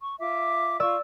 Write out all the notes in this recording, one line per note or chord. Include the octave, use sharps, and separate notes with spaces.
C#6
F4 E5 D6
F4 D5 C#6 E6